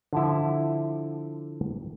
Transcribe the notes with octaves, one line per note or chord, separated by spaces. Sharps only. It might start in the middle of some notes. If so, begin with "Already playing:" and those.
D3 F3 E4